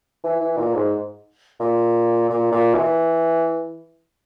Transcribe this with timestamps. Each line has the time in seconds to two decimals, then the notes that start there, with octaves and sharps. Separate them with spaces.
0.24 E3
0.40 E3
0.58 A#2
0.74 G#2
1.60 A#2
2.30 A#2
2.52 A#2
2.75 E3